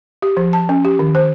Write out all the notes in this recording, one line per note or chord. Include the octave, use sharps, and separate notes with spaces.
G4
F3
A5
C#4
G4
D#3
C5